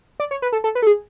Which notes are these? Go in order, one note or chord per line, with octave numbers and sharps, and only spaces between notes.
D5
C#5
B4
A4
A4
B4
A4
G#4